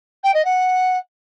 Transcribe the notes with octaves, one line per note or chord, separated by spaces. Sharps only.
G5
D#5
F#5